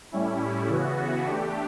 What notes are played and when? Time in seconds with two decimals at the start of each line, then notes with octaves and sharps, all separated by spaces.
0.12 A2 G3 C#4 E4
0.69 C#3 E3 B3 F#4
1.26 A3 D4 G4